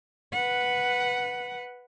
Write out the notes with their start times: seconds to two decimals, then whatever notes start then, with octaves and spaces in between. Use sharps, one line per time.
0.33 B4 F#5